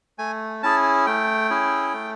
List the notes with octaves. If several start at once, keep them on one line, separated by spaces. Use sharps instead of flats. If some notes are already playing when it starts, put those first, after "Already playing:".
A3 G#5
C#4 E4 G#4 A5
A3 G5
C#4 E4 G#4
A3